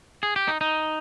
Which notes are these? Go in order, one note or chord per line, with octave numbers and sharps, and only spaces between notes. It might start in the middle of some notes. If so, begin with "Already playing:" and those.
G#4
G4
D#4
D#4